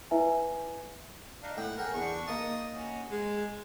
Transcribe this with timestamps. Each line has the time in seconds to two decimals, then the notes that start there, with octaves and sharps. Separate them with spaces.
0.11 E4 B4 E5 G#5
1.43 D4 D#4 F5
1.57 A2 F#5 G5
1.78 G#4 A#4 F#5 G5
1.94 E2 D4 C#6
2.28 A#3 D#4 A5 D#6
2.74 C#4 F#4
3.11 G#3